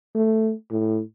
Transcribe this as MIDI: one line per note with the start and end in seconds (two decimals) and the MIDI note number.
0.15 0.53 57
0.71 1.01 45